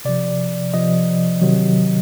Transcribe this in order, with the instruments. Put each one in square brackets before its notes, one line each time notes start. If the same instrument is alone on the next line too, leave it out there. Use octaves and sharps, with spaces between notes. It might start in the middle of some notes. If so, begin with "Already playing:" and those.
[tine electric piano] C3 F3 D5
C3 F3 D#5
C3 D#3 F#3